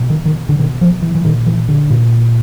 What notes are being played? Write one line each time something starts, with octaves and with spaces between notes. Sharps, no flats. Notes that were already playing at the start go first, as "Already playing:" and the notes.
Already playing: B2
D#3
D#3
D3
B2 D#3
F3
E3
E3
A#2 D#3
E3
D3
A#2